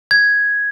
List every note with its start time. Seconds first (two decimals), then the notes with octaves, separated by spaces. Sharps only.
0.11 G#6